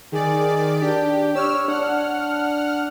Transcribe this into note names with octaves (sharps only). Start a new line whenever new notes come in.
D#3 G#4 D5
D4 G4
C#5 E6 F6
D4 F#5 F6